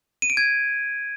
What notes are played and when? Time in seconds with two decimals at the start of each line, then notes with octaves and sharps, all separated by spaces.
0.22 D#7
0.30 D7
0.37 G#6